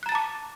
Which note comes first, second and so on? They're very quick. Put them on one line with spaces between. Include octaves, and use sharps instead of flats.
F#6 A#5 A6 A5 D6